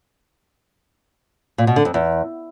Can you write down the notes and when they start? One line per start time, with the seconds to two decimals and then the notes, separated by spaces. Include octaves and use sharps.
1.58 A#2
1.67 B2
1.76 D3
1.85 F2
1.94 E2